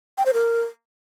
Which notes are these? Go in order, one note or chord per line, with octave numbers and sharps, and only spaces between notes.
G5
C5
A#4